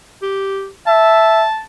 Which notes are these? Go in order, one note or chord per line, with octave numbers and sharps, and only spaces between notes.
G4
E5 A5